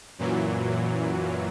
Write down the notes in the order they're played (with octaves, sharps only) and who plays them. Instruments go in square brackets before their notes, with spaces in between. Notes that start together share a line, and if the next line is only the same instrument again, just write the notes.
[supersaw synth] F#2 A#2 E3 F#3